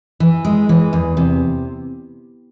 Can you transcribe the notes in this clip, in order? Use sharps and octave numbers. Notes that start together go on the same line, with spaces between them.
E3
G#3
E3
E2
C3